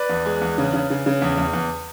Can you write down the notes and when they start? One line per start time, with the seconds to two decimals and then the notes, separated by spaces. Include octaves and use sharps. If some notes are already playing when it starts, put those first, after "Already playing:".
Already playing: B4 D5
0.09 E2
0.26 G#3
0.42 E2
0.58 C#3
0.73 C#3
0.90 C#3
1.06 C#3
1.22 E2
1.38 E2
1.53 E2